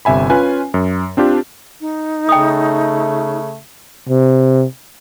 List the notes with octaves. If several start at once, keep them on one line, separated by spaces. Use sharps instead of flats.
G1 C3 E5 G#5 B5
C#4 F4 B4 G#5
F#2
C4 D4 F4 G4
D#4
C#3 A3 G5 D#6
C3